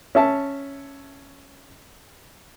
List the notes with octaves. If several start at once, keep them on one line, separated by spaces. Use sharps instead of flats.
C#4 E5 A5